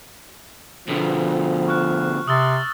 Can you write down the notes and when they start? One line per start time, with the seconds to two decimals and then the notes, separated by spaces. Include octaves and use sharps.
0.88 B2 D3 F3
1.68 C#6 F6 F#6
2.28 C3 D#6 E6 A6